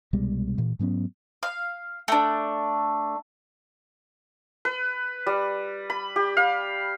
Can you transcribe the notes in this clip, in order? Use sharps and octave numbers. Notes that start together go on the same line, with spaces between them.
C2 B2 G3 G#3
A#2 E3
G#2 F#3 B3 C#4
F5
A3 D4
B4
G3
B5
G4
F5